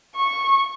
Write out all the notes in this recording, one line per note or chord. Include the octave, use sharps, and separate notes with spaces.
C#6